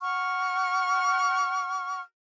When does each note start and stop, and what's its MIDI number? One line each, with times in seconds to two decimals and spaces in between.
0.01 2.00 78
0.01 2.00 85
0.01 2.00 89